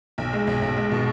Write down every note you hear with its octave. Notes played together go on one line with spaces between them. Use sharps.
B1
G#3
B1
B1
G#3
B2